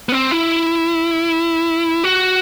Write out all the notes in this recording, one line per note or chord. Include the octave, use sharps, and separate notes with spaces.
B3
C4
E4
F#4